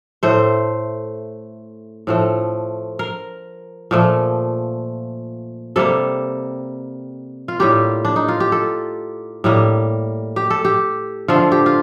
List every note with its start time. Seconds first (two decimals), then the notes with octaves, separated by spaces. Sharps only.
0.23 A2 A3 C5
2.07 A2 F3 A3
2.99 A#4
3.91 A#2 F3 A3
5.76 C3 G3 A#3 A4
7.48 F4
7.59 A2 G3 A#3 G4
8.05 D4
8.16 D#4
8.28 F4
8.40 G4
8.52 A4
9.44 A2 G3 A#3
10.36 G4
10.50 A4
10.65 G4
11.28 D3 F3 A3 F4
11.52 G4
11.66 F4